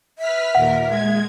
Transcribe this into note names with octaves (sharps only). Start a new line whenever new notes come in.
B4 E5 F6 B6
D#2 A#2 A#4 F#5
G#3 G#6